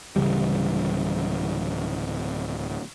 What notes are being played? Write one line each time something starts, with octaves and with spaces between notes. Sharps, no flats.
D1 C#3 E3 G3